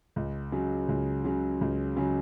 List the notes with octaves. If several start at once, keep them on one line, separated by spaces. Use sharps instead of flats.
C#2
C#3 F#3
C#2
C#3 F#3
C#2
C#3 F#3